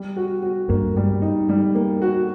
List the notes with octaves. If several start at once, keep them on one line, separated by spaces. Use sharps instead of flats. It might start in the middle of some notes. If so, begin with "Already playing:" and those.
Already playing: G3
F#4
F#4
G2 A#3
G3
D#4
G3
A#3
F#4